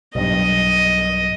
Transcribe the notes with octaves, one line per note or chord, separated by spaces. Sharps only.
B1 G2 D#5